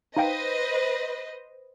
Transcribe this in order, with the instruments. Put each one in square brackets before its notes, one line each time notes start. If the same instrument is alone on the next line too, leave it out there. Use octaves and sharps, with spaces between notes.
[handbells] D#4 F5 G5 [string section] B4 C5 D#5